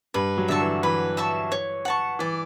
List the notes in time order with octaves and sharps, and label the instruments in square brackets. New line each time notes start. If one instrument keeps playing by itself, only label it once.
[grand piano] G2 [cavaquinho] B4
[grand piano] F#3
[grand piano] D3 [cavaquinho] E5 A5 C#6
[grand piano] E3
[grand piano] E3 [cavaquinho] B4
[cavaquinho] E5 A5 C#6
C#5
F#5 A5 C#6
[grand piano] E3 [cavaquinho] D5